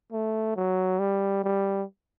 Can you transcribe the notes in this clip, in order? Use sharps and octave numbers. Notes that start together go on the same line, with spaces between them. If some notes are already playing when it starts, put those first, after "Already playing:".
A3
F#3
G3
G3